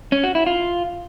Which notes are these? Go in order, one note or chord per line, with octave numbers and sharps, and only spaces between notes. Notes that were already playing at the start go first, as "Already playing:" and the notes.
C#4
F#4
E4
F4